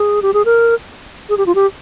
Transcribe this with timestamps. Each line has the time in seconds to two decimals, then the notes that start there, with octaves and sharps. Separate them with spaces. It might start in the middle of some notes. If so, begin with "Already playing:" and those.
Already playing: G#4
0.22 G4
0.34 G#4
0.45 A#4
1.29 G#4
1.37 G4
1.46 F4
1.55 G4